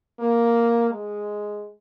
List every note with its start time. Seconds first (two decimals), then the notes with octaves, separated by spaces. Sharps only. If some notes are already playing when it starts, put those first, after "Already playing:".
0.19 A#3
0.90 G#3